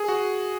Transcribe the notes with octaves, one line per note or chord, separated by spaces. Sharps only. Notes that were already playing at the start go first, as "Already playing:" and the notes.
Already playing: G#4
F#4